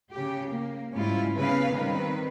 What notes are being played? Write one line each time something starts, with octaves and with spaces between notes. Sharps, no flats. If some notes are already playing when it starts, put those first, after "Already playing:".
C#3 G4
A#3
G#2 C#3 G3 C#4 E4 F4
C#3 B3 B4 F5
D#3 G3 C4 B4